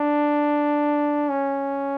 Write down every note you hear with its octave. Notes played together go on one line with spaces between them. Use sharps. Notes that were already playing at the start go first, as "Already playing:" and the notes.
Already playing: D4
C#4